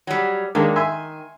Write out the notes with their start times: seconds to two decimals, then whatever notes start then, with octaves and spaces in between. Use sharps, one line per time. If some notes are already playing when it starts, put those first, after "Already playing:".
0.07 F#3 G3
0.55 D#3 G#3 A#3 D4
0.76 E5 G#5 C6